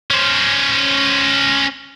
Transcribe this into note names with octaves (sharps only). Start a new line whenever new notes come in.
C#4 C5